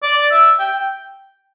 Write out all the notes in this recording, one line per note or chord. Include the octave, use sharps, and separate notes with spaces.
D5
E5
G5